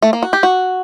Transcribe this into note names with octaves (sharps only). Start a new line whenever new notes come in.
A3
A#3
F#4
G4
F#4